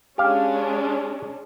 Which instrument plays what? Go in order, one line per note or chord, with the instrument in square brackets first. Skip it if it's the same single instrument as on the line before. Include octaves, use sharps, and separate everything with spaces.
[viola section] G#3 C#4 D4 [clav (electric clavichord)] G4 F5